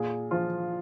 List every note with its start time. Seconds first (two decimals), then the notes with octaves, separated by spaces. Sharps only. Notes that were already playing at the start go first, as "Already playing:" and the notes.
Already playing: A#2 G#4
0.31 F3 F4